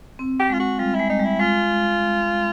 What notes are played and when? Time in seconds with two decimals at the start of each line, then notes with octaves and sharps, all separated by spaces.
0.19 C4
0.40 G4
0.49 G#3 F4
0.60 F#4
0.79 G3 F4
0.95 G#3 E4
1.10 D#4
1.20 G3 E4
1.40 G#3 F4